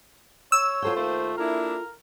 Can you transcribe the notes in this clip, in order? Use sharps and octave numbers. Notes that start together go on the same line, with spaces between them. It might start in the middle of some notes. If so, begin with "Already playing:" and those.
C#5 E6
F#3 F4 A4 C5 G5
D#2 A3 A#3 C5
A#3 D4 E4 A#4